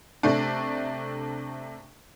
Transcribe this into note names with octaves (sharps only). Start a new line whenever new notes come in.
C3 A3 D4